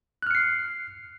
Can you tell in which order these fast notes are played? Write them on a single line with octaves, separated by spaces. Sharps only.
F#6 F6 C#7 C7